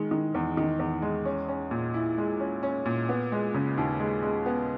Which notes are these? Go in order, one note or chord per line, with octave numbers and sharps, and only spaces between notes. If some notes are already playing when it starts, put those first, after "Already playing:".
Already playing: D#3 G#3
D#3
E2
D#3
E2
G#3
C#4
C#4
A#2
E4
G#3
C#4
C#4
A#2
B3
G#3
C#3
D#2
G#3
G#3
B3